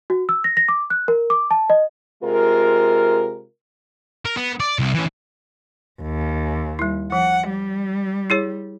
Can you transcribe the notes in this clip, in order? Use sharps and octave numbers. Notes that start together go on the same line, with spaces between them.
F#4
E6
A#6
A#6
D6
F#6
A#4
D6
A5
D#5
C3 G#3 F4 A#4
A#4
B3
D5
C2
E3 C#4
D#2
G3 E4
F3 F#5
G3
E4 G#4 C#5